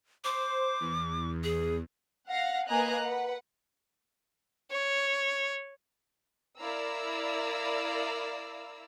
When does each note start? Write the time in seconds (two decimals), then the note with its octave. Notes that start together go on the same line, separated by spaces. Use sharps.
0.24 C5 D6
0.80 E2
1.44 G#4
2.29 F5 F#5 A#6
2.69 A#3 B4 D#5 G#5 A#5 F#6
3.02 B4 F#5
4.71 C#5
6.59 E4 A#4 D5 F5 A#5 E6